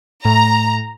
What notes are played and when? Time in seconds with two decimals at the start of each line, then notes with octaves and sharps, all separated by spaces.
0.25 A2 A#5